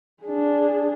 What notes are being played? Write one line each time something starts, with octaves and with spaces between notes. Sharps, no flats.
D4 G#4